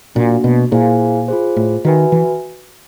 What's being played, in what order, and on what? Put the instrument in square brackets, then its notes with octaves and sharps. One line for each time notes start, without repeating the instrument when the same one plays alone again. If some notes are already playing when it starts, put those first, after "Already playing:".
[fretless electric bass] A#2 [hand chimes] A#3 D4 F#4
[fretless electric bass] B2
[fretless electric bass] A#2 [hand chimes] E4 G#4 C5 F5 G#5
[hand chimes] F4 G#4 C5
[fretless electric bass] A2
[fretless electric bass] D#3 [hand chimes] F#4 B4 E5 G#5
[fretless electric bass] E3